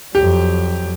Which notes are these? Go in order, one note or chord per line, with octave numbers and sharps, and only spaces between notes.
F2 F#3 G4